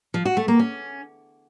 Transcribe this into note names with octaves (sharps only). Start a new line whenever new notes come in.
F3
F#4
A3
A#3
C#4